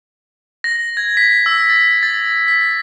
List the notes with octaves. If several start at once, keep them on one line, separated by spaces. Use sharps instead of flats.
A#6
G#6
B6
E6
A6
A6
B6